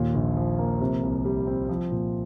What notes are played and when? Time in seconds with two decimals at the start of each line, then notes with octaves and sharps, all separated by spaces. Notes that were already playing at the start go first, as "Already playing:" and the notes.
Already playing: D#2 A#2
0.15 A#1
0.37 F3
0.59 A#3
0.81 C3
1.03 C2
1.25 G3
1.47 C4
1.69 F3
1.92 A#2